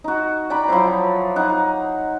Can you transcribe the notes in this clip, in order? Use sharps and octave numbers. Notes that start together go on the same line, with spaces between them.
D#4 F#4
D5 G5 A#5 B5
F3 F#3 E4 C5
D#4 F#5